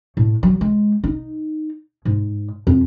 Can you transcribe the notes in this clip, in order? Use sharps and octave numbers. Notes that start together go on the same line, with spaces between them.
A2
F#3
G#3
D#4
G#2
F2